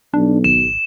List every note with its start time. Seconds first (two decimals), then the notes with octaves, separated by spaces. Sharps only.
0.14 B1 D4
0.44 G#1 E7